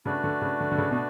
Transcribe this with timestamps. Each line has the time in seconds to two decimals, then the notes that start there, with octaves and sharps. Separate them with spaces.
0.06 C#3 A3 D4 F#4 B4 D5
0.24 D3
0.42 C#3
0.61 D3
0.72 D3
0.78 C#3
0.91 B2